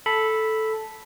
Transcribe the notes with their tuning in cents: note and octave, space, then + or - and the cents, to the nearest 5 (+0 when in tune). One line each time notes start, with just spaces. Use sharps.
A4 -5 B5 +0